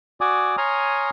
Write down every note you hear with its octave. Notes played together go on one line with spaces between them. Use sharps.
F#4 D5 G#5 D6 D#6
C#5 G#5 A#5 C6 D#6 F6